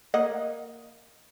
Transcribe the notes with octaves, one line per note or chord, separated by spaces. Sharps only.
A#3 D#5 F#5